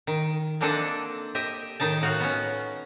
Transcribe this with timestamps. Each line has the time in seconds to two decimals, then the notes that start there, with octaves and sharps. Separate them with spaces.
0.07 D#3
0.61 A#3 C4 D4 A4 D#5 F#5
1.35 G4 D#5 E5
1.80 A2 D#3 D#4 A5
2.01 A2 F#4 F5
2.20 B3 C#4